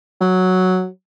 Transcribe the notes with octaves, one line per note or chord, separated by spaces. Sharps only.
F#3